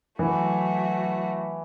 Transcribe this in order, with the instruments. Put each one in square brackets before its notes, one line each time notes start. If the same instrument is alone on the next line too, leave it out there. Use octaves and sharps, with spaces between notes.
[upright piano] E3 [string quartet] F#3 A3 F#4